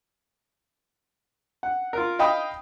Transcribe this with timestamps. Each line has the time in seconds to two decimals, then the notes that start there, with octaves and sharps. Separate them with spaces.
1.63 F#5
1.93 F4 A#4
2.19 D#5 F5 G5 B5 D#6